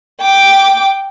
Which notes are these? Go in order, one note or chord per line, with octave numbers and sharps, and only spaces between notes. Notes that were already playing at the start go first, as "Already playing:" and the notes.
G5 D6